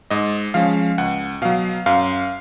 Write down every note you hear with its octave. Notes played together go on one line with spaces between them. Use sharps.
G#2 D#5
F3 G#3 C#4 F5
C#2 F#5
B2 F#3 F5
F#2 F5